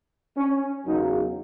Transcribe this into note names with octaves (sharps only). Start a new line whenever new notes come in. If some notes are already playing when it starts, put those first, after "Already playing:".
C#4
E2 C#3 F#3 A#3 D#4